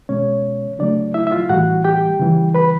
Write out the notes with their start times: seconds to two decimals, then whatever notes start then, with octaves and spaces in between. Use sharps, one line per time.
0.09 B2 G#3 C#4 C#5
0.79 C#3 F#3 A3 D4 D5
1.14 E4 E5
1.27 E5
1.32 F4 F5
1.49 A2 E3 G3 F#4 F#5
1.84 G4 G5
2.19 C#3 E3 G3
2.55 B4 B5